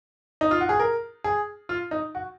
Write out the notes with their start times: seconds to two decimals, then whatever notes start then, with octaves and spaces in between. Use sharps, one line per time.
0.41 D#4
0.51 F4
0.61 F#4
0.69 G#4
0.80 A#4
1.24 G#4
1.69 F4
1.91 D#4
2.15 F#4